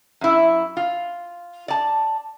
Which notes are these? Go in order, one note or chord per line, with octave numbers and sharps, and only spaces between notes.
F#2 E4
F4
D5 A5